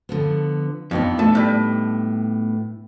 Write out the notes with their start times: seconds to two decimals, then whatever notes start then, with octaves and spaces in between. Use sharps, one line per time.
0.09 D3 F3 B3
0.91 F2 B3 D4 D#4
1.19 A3 A5
1.35 A2 G3